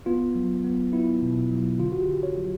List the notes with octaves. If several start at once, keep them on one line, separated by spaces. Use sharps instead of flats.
B3 F4
F#3
B3
B3 E4
B2
F#3
D3 F4
F#4
G4
D3
C#5
F#3